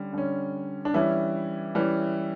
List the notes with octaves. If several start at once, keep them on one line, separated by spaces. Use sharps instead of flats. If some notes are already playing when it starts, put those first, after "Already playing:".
Already playing: D3 G3 C#4
D3 G3 C#4
D4
E3 G3 C#4 E4
E3 G3 C#4